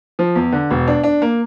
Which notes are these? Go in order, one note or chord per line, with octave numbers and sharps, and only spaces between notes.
F3
E2
D3
E1
D4
D4
A#3